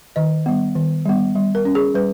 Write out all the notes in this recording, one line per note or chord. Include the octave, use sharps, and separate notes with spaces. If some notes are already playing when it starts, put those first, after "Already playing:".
D#3 D#5
G3 B3
D#3
G3 B3
G3
A#4
C#4
G#4
G3 B4